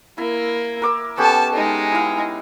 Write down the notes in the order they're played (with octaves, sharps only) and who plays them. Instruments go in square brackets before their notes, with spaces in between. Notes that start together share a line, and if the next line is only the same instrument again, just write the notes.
[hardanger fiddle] A#3 [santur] E4
[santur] A#4 D6 E6
[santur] B3 C#4 G4 [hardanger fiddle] A4 A5
[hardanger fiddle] G#3 D#4
[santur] E4 F5